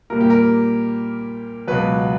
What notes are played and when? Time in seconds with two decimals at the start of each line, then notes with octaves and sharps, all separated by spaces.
0.10 A#2 G3 A#3 A#4
0.20 G4
0.30 A#4
1.67 C#2 B2 F#3 B4